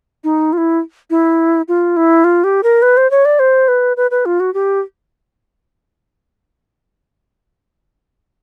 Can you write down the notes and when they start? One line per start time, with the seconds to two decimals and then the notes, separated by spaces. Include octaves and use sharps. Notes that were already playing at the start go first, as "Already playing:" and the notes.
0.24 D#4
0.53 F4
0.58 E4
1.10 E4
1.68 F4
1.97 E4
2.24 F4
2.44 G4
2.63 A#4
2.82 B4
2.97 C5
3.11 C#5
3.25 D5
3.39 C5
3.68 B4
3.97 B4
4.11 B4
4.26 F4
4.40 F#4
4.54 G4